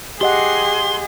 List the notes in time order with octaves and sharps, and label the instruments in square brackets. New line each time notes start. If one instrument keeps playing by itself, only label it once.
[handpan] G4 D#5 F#5 [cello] G#4 [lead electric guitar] C6